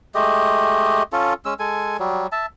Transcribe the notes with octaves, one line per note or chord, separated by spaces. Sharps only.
G#3 A3 G4 D#5
C#4 F4 A4
G#3 C#4 E6
G#3 A4 G#5
F#3 G3
E5 A5